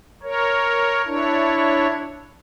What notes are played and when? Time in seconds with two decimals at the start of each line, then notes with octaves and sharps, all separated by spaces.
0.23 A#4 C#5
1.06 D4 E4 C#5